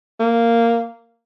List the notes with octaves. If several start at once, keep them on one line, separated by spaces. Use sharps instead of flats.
A#3